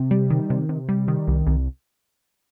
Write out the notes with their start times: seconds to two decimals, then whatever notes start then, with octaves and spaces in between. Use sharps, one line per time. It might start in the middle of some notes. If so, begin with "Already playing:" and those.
Already playing: C3
0.11 G3
0.30 D#3
0.50 C3
0.69 C3
0.89 G3
1.08 D#3
1.28 C2
1.47 C2